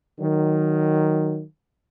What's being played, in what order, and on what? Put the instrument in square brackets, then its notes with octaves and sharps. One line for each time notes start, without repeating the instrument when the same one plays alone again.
[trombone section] D#3 F#3